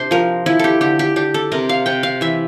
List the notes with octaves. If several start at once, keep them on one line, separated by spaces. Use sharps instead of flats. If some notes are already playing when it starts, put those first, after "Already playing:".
Already playing: C3 D4 C5 D5
F3 A#4
F3 E4
G4 A4
D3 G4
G4
D4 G4
A4
C3 A#4
F5
C3 G5
F5
E3 E5